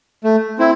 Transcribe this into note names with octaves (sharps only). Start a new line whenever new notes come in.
A3
C4 E4